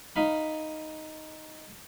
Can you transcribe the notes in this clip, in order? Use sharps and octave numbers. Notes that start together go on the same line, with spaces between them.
D#4 F5 B5